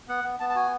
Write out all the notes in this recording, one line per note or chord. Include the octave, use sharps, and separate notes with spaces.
B3 F#5
B3
B3 A5
A5
F#4 G#5